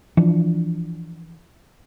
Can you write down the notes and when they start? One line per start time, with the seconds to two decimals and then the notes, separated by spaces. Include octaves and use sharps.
0.17 E3 F3 D4